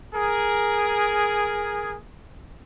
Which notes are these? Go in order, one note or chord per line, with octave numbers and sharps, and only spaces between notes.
G#4 A#4